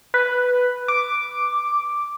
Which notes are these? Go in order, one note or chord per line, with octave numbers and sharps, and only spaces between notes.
B4
D6